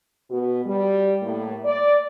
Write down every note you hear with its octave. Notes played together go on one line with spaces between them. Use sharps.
B2 B3 F#4
G3
A2 A#3
D5